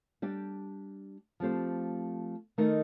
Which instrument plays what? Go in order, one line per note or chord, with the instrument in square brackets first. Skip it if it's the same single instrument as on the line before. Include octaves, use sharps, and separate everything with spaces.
[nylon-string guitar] G3 D4 G4
F3 A3 C4 G4 C5
D#3 A3 D#4 A#4 D#5